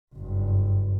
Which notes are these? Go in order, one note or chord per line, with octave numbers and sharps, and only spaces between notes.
F#1 G2